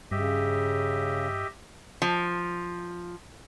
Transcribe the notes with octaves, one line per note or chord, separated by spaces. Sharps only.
G2 C#3 G4 D#5 E5
F3